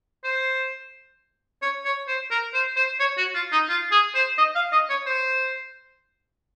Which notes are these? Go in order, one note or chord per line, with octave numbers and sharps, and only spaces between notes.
C5
C#5
C#5
C5
A#4
C5
C5
C#5
F#4
F4
D#4
F4
G#4
C5
D#5
F5
D#5
C#5
C5